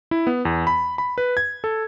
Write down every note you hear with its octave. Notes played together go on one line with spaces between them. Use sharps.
E4
B3
E2
B5
B5
B4
G#6
A4